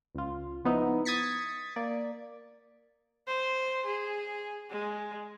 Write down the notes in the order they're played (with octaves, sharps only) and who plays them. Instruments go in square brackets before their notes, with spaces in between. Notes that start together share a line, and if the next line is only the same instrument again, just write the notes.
[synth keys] C#2 F4
F3 B3 D#4 E4
D#6 G#6 A6 B6 C#7
A#3 D5
[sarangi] C5
G#4
G#3